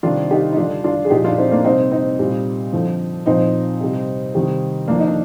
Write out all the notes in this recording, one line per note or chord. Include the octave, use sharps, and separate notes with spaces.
C3 D#3 G3 D4 F4
D#4 G4
D#4
D3 G3 D4 F4
D4 F4
G#4
A#2 F3 D#4 G4
D4 F4
C4 D#4
A#3 D4
C3 G3 C4 D#4
C4 D#4
A#2 G3
D3 F3
A#2 F3 C4 D#4
C3 G3
C3 D#3 G3
D3 F3 A#3 D4
D#4
D4